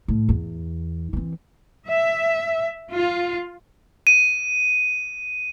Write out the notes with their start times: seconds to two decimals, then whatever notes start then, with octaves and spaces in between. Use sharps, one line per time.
0.08 A2
0.29 E2
1.13 E3 C4
1.87 E5
2.92 F4
4.07 D#7